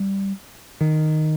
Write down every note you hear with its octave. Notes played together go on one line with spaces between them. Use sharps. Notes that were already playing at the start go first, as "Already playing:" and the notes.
Already playing: G3
D#3